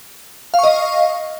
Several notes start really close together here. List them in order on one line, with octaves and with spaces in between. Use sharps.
F5 C#6 D#5